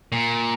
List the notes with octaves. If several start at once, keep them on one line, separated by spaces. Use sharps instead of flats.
A#2